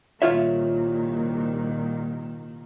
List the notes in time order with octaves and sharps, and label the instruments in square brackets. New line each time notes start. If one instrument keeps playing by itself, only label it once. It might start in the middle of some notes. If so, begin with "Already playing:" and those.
[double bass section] C2 A#2 D#3 [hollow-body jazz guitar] F4 C#5 E5